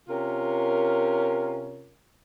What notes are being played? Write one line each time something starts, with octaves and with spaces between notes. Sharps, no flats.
C3 C#4 F4 A#4